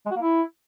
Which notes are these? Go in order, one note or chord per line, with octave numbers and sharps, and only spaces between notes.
G#3
F#4
A#3
E4